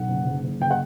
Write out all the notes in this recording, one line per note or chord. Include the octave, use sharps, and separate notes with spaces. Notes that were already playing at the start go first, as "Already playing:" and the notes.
Already playing: B1 F#5
F#1
F#1
F#1
F#1 G5
F#5